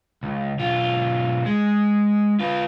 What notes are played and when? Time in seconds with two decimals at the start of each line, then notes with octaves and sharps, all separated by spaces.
0.23 C#2
0.59 B1 F4
1.46 G#3
2.40 F4 B4